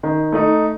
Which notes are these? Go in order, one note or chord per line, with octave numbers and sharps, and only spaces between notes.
D#3
A3 D#4